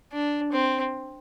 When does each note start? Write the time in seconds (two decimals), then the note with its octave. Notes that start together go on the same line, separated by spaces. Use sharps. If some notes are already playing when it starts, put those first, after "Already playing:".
0.12 D4
0.52 C4